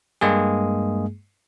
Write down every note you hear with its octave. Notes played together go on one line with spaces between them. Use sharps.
G2 G#3 A#3 G#4